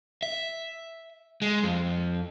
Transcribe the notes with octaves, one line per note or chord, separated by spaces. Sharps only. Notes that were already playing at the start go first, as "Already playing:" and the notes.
E5
G#3
F2